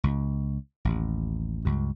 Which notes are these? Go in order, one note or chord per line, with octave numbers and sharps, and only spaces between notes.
C#2
A1 D#2
C#2 G2